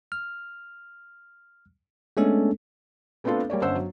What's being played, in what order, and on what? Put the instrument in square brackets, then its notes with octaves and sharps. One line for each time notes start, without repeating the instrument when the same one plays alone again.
[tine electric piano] F6
G#3 A3 B3 C#4 D4 A4
[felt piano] A3 B3 C4 D4 F4 A4
G3 A#3 C#5 D5
G1 C#4 D4 C5 F#5 E6
F#3